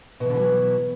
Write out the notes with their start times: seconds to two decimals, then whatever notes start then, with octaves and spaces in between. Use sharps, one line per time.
0.20 B2
0.25 E3
0.30 D3
0.35 E4
0.40 F#3